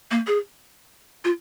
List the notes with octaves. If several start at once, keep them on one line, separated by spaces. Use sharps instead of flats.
A#3
G#4
F4